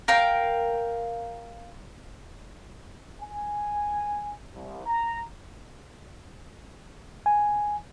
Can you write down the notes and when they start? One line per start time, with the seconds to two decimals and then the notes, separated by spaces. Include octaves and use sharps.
0.08 A#4 F5 G5
3.22 G#5
4.55 C2
4.86 A#5
7.26 G#5